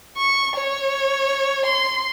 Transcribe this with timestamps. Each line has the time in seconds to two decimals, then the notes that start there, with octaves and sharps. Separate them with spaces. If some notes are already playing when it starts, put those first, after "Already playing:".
0.17 C#6
0.56 C#5
1.66 C6